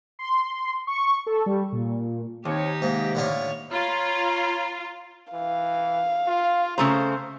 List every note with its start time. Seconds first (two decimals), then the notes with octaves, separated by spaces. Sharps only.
0.19 C6
0.87 C#6
1.26 A4
1.46 G3
1.72 A#2
2.45 D#2 C4 D#4 G4 C#5
2.82 G#2 C3 A#3
3.15 A2 D3 F4 C#5
3.71 F4 C#5 A#5 B5
5.33 E3 F5
6.27 F4
6.78 C#3 A3 C5 A#5